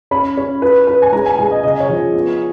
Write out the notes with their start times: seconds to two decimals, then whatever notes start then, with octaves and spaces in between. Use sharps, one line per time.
0.11 C#4 B5
0.37 C#4
0.62 B4
0.87 B4
1.02 G#5
1.12 G#3 A#5
1.26 G#5
1.38 G#3 G#5
1.51 D#5
1.63 C#3 D#5
1.80 C#5
1.89 F3
2.14 B3